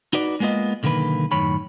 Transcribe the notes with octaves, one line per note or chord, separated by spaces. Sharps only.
D#4 F#4 B4 D5
G#3 A#3 B3 F4 D#5
B1 D3 D#3 A#3 B4
F#2 A2 D#3 C#5 B5